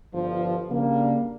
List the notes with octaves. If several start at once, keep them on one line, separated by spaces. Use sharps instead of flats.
G1 G2 F3
C#3 G3 A#3 D4